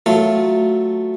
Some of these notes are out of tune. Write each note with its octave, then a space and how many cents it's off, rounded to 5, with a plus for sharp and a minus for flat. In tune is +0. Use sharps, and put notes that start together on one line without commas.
F#3 +0 A3 +0 F4 +0